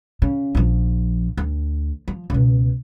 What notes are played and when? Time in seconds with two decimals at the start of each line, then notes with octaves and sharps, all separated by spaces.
0.22 C#3
0.55 A#1 F3
1.37 D2
2.08 F3
2.30 C#2 B2